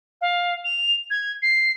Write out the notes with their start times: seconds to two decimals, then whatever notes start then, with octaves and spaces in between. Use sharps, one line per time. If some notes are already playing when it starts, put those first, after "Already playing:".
0.21 F5
0.64 F7
1.10 G#6
1.42 C7